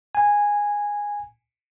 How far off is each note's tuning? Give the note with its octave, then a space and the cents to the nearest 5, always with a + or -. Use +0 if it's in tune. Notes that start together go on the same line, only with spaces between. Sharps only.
G#5 -10